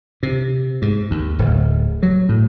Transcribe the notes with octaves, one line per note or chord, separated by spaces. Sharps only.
C3
G#2
D#2
D1
F#3
A2